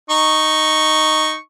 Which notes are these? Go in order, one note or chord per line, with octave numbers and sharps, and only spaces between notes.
D#4 C#6